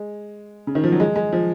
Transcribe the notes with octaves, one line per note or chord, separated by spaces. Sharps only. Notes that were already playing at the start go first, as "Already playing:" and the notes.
Already playing: G#3
C#3
D#3
F3
F#3
G#3
G#3
F3